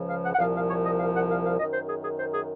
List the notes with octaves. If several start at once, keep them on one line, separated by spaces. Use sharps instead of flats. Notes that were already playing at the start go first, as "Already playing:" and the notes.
Already playing: C#2 C#3 F3
F5
F#5
F#5
C2 A#2 F3 F5
F5
C#5
D#5
F5
F#5
F5
F5
F#2 D#3 D#5
C5
G#4
G#4
C5
G#4